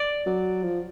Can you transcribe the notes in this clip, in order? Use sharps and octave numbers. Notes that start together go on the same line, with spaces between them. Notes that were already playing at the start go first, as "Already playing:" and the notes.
Already playing: D5
F#3
F3